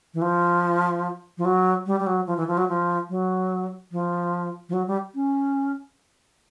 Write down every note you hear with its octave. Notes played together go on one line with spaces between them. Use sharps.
E3
F3
F3
F#3
G3
G3
F#3
F3
E3
F3
F#3
F3
F#3
F3
F3
F#3
G3
C#4